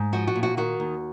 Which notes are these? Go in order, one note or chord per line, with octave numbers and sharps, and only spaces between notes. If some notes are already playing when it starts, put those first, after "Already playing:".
Already playing: G#2
F3 F#4
F#4
A#2
F#4
D#3 F#4
D#2